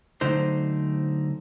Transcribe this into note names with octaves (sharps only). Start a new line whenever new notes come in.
D3 F#3 A3 C4 D#4 C5